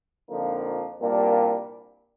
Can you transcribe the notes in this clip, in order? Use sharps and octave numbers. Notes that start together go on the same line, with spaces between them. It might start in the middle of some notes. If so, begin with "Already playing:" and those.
F2 D3 F3 A#3 D#4
C2 A#2 G3 A#3 D4